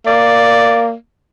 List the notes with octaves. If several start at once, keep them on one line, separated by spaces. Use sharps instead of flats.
A#3 D5